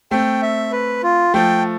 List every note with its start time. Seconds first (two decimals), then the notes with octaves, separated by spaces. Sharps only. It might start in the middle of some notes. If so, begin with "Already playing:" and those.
0.11 A3 C4 G5
0.42 E5
0.72 B4
1.03 F4
1.34 F3 A3 G5